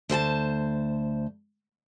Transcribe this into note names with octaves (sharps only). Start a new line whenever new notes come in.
D2 C5 G#5 A5